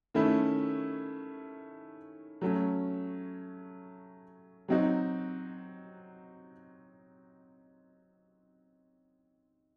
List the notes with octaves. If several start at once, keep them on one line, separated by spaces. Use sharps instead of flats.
D#3 A3 C#4 E4
F#3 A3 C#4
F#3 C4 D#4 F#4